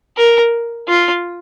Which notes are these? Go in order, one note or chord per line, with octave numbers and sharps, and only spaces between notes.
A#4
F4